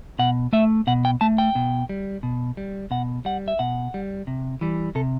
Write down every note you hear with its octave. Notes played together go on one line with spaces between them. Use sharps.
B2 F#5
A3 E5
B2 F#5
G5
A3 A5
G5
B2
G3
B2
G3
B2 F#5
G3 F#5
E5
B2 F#5
G3
C3
E3 G3
C3 A4